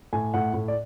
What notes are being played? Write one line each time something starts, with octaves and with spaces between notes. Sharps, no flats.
A2 G#5
A2 F#5
A2
D5